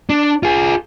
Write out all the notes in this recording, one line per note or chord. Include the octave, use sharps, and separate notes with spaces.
D4
F4 G#4